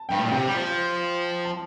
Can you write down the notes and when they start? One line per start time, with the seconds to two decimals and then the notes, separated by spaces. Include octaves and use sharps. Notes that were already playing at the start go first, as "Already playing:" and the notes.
Already playing: A5
0.09 G2 G5
0.17 A2
0.24 A#2
0.31 C3 G5
0.47 G3
0.54 F3
1.45 A5